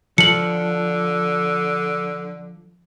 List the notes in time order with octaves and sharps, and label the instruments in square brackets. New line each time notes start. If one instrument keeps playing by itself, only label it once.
[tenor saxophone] D3 [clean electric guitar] F3 [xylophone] C#7 F#7